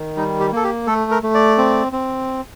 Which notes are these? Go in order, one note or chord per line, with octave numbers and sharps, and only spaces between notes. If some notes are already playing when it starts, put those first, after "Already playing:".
Already playing: D#3
G3 D#4
G4
A#3 A4
G4
A3 A4
A#4
A3
D5
C4
C4